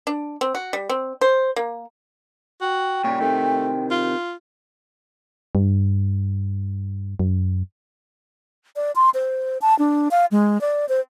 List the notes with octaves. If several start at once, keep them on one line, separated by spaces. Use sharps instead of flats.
D4
C4
F#4
G3
C4
C5
A#3
F#4 G5
A#2 C#3 G3 C#5
C3 D#3 A3
F4
G2
F#2
D5
C6
C5
A5
D4
F5
G#3
D5
C5